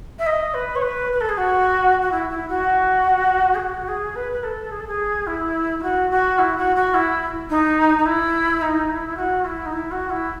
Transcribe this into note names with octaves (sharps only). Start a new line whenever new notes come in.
E5
D#5
B4
C#5
B4
B4
A4
G#4
F#4
F#4
E4
E4
F#4
G#4
F#4
G#4
B4
B4
A4
G#4
A4
G#4
E4
E4
F#4
F#4
E4
F#4
F#4
E4
D#4
D#4
E4
D#4
E4
F#4
E4
D#4
E4
F#4
E4